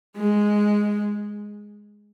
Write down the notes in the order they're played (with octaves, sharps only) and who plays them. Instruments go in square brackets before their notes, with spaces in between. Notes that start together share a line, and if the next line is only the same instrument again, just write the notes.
[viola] G#3